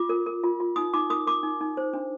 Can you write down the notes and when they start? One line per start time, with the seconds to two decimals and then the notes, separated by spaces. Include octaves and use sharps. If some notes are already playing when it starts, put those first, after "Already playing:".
Already playing: F4 D6
0.09 A#4
0.26 A#4
0.43 F4
0.60 F4
0.76 D#4 D#6
0.94 D#4 D6
1.10 A#4 D#6
1.26 A#4 D6
1.43 D#4
1.61 D#4
1.77 C5
1.93 D4